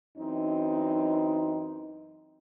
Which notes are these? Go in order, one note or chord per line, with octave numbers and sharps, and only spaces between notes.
F#2 E3 C4 D#4